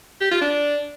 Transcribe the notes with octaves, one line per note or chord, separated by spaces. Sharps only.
G4
F4
D4